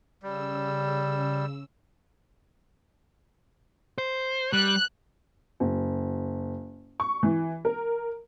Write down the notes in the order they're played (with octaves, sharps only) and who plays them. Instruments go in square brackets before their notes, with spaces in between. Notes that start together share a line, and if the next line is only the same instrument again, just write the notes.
[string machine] C#3 E6 [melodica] G3
[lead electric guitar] C5
[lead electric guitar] G3 [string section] F#6
[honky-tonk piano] F#1
C#6
E3
A#4